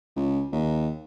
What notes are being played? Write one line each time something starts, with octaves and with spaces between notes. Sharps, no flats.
C#2
D#2